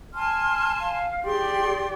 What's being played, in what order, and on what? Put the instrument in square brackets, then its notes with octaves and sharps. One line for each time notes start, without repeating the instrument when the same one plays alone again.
[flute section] G#5 A5 C6 [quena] F6
[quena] F5
[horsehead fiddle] G4 D5 [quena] G#4 [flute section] C6